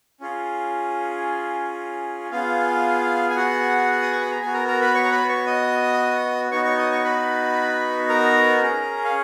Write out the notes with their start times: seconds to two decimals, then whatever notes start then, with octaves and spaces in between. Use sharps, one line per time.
0.21 C#4 F4 G#4
2.31 B3 F4 G#4 F5
3.30 G#5
3.36 F#4 F#5
4.02 D#6
4.12 C#6
4.21 B5
4.31 A#5
4.41 B3 F#4 G#4 G#5
4.54 A#4 A#5
4.67 A#4 A#5
4.81 B4 B5
4.94 C#5 C#6
5.05 A#5
5.11 B4 B5
5.28 C#5 C#6
5.46 D#5 D#6
6.51 B3 D#4 F#4 C#5 C#6
6.65 C#5 C#6
6.77 D#5 D#6
6.90 C#5 C#6
7.04 B4 B5
8.09 A#4 A#5
8.62 C#4 G#4
9.04 F5